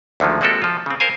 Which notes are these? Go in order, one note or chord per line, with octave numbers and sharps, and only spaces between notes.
D2 D3 D#3 F3 G#3
G#3 A#3 C4 F#4 G4 A4
F3 F4
C#3 C4
A#4 C5 F5 G#5